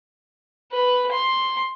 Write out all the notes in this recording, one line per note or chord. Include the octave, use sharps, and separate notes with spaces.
B4
C6